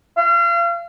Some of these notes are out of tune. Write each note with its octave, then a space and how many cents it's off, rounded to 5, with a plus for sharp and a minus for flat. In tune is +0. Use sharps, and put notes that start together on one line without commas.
F5 -35